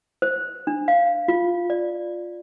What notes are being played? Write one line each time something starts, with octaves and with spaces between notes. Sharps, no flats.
C5
D4
F5
F4
D5